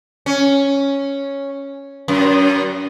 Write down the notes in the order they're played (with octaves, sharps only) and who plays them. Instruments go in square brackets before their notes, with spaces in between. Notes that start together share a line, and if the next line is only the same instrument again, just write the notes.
[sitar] C#4
F#2